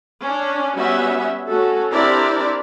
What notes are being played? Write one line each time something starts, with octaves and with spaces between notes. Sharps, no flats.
C#4 D4
G3 B3 C#4 F#4 E5
A3 C#4 F#4 A4
C4 D4 E4 G4 A#4 D5